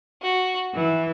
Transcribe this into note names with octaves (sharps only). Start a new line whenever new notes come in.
F#4
E3